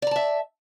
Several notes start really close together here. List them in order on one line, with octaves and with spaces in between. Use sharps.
D5 A#5 A5 E5